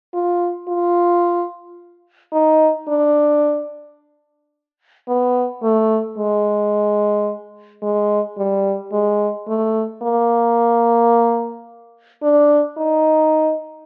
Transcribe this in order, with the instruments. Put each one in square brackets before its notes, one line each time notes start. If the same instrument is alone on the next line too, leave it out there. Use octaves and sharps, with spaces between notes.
[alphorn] F4
F4
D#4
D4
B3
A3
G#3
G#3
G3
G#3
A3
A#3
D4
D#4